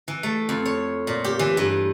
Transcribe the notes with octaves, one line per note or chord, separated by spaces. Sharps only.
E3
A3
F2
C#5
A#2
G4
E3
G2